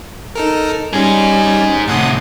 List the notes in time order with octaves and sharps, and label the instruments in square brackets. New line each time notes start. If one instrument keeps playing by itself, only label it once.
[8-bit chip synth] D#4 A4 A#4
[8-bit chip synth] G3 C#4 [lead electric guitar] D#4 G#4
[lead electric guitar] A2 C3 [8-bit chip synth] F#5 C6 D#6